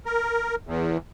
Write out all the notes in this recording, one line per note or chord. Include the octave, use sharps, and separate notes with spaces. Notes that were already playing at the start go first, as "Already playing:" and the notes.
A#4
E2